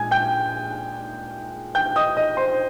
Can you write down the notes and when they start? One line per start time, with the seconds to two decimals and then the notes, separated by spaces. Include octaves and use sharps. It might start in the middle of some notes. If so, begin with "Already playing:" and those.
Already playing: A#2 G#3 G#5 G#6
0.11 G5 G6
1.75 G5 G6
1.96 D#5 D#6
2.17 D#5 D#6
2.37 C5 C6